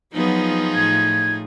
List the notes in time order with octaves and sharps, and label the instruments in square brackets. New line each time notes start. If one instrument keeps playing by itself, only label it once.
[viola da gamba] F3 F4 G#4 [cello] F#3 B3 [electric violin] D#4
[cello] A2 [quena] G#6